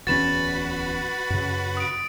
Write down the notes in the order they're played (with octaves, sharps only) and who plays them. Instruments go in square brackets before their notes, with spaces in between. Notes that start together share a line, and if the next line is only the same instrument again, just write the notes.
[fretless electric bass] D1 E2 C#4 [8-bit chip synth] F#4 B4 B5 [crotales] A6 E7
[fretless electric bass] F#2 C#3
[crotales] D#6 D7